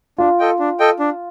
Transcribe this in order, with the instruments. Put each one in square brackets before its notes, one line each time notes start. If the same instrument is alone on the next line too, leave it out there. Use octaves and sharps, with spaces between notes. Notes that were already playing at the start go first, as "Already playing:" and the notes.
[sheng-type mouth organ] D4 [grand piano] F4
[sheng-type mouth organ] A4 D#5 G5
D4
A4 D#5 G5
D4